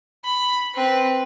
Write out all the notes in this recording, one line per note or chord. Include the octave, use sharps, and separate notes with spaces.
B5
C4 B4